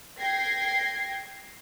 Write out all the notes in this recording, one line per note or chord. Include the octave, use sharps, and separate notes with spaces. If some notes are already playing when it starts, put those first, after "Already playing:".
G5 G#6 A#6 C7